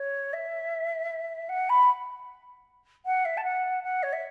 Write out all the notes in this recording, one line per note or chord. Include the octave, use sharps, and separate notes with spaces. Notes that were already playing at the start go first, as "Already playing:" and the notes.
Already playing: C#5
E5
F#5
B5
F#5
E5
A5
F#5
F#5
C#5
E5